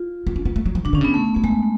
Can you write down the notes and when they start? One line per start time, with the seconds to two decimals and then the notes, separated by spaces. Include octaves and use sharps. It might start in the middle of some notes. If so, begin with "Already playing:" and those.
Already playing: F4
0.27 B3
0.36 C#4
0.45 B3
0.56 A3
0.66 F#3
0.75 F3
0.85 C#3 D4
0.93 D3 C#4
1.01 C#3 B3
1.14 A3
1.24 B3
1.35 A3 C#4
1.44 G#3 B3